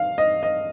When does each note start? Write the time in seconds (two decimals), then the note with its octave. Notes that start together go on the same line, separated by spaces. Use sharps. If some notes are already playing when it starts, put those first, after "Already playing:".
Already playing: F5
0.18 D#5
0.43 D#5